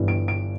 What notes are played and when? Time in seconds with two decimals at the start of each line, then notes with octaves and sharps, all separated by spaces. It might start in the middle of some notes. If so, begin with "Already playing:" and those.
Already playing: G1 G2 E3 G3
0.08 D7
0.28 D7